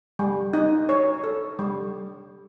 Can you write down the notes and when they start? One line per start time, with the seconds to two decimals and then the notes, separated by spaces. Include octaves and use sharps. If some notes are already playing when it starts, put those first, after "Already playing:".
0.19 G3
0.53 D#4
0.89 C#5
1.24 A4
1.59 G3